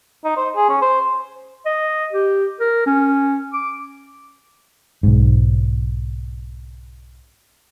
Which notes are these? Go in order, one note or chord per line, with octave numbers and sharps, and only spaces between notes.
D#4
C5
G#4
C#4
C5
D#5
G4
A#4
C#4
D6
B1 G#2